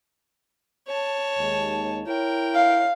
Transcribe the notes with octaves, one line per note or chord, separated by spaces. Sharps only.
C#5 A5
D#2 G#3
E4 A#4 C#5 G5
F5